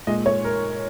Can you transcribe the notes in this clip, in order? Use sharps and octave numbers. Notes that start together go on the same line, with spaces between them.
A#2 G#3 D#5
C#5
A#4